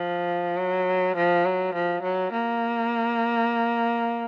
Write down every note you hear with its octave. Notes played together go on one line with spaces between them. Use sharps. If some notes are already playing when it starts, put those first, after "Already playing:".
Already playing: F3
F#3
F3
F#3
F3
F#3
A#3